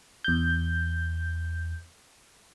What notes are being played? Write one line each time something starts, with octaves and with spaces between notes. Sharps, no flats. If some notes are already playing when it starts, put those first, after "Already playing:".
E2 G6